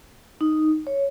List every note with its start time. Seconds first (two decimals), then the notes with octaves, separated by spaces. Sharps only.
0.41 D#4
0.87 C#5